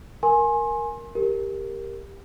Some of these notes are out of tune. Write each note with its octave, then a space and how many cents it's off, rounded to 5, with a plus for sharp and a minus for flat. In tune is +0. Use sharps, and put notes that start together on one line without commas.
A#4 +5 G#5 +10 C6 +30
G4 +10 A#4 +0